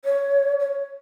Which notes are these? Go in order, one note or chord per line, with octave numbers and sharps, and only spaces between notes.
C#5
C#5